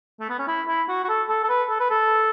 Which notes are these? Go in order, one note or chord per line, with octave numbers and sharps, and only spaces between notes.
A3
B3
C#4
E4
E4
F#4
F#4
A4
A4
A4
B4
A4
B4
A4